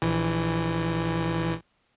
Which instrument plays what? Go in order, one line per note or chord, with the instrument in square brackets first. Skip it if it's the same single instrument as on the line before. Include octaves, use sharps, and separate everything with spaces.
[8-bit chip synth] A#1 E3